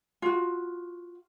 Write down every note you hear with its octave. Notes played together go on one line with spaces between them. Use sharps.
F4 F#4